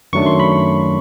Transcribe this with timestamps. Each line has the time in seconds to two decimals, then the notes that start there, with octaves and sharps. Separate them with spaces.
0.13 F#2 D#3 F#3 A3 D4 C#6
0.26 C6
0.40 B5